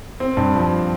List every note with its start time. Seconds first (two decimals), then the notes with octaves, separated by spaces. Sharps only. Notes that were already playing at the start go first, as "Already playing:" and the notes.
0.20 C4
0.37 G2
0.55 F3